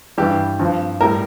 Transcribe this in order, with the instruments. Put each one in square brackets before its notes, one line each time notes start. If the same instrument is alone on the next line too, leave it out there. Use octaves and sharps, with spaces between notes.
[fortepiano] G2 E3 G3 G4
G2 F3
A2 G3 A#4